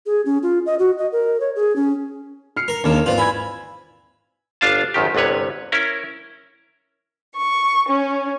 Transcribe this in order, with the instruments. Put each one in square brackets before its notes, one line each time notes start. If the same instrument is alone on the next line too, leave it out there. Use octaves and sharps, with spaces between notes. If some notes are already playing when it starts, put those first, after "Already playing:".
[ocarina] G#4
C#4
F4
D#5
F#4
D#5
A#4
C#5
G#4
C#4
[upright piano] F6 C7 C#7
[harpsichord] A#4
[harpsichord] D#2 C#3 [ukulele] D4 A#4
[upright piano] G#1 C4 F#7 [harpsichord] F4 [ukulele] B4 D5
[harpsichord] E4 [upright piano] G#5 B5 G#6
[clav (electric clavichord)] G1 D4 F4 F5 A5
G#1 F#2 D#3 G4
G1 C2 C3 B4 C#5
C#4 E4 A#4
[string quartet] C#6
C#4